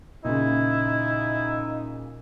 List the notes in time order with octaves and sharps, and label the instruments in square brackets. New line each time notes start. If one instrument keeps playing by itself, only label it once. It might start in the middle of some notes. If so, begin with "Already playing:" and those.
[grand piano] A#2 C#3 [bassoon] D#4 [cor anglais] E4